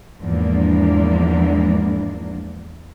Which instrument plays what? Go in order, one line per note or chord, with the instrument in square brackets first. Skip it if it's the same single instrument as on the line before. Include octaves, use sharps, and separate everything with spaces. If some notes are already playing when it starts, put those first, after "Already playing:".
[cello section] E2 G#2 E3 F3 A#3 D4